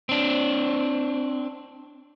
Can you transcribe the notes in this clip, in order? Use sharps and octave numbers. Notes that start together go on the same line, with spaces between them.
C4 D4